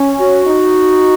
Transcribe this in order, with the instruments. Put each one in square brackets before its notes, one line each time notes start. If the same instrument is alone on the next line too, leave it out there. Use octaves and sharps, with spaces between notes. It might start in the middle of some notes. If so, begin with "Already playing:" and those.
Already playing: [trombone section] C#4
[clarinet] F#4
[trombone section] D#4